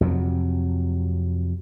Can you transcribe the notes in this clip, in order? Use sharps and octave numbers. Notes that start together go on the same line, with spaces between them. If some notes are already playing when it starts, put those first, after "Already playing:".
F2 C3 F#3